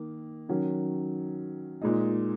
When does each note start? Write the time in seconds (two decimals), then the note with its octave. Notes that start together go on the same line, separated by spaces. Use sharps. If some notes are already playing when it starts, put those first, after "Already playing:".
Already playing: D#3 A#3
0.49 D#3 F#3 C#4
1.82 A#2 G#3 D#4